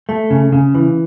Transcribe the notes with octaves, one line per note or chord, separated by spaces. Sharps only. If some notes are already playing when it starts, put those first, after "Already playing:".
A3
C#3
C#3
E3